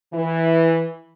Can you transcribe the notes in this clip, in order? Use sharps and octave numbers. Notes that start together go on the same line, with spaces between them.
E3